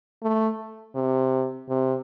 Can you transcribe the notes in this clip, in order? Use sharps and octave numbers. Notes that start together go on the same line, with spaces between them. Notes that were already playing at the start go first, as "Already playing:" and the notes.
A3
C3
C3